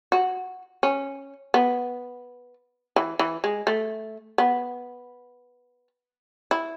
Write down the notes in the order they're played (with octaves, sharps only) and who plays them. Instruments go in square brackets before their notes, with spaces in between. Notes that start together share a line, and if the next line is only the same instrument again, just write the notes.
[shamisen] F#4
C#4
B3
E3
E3
G#3
A3
B3
E4